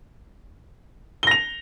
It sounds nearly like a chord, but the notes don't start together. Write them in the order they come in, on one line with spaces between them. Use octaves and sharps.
G7 A#6 F7